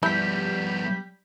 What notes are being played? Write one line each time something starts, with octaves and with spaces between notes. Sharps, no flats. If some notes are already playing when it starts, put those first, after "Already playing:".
F3 G3 B3 E4 G6 B6